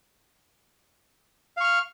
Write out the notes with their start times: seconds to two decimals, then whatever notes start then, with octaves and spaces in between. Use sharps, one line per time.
1.57 F5
1.60 C#6
1.64 F6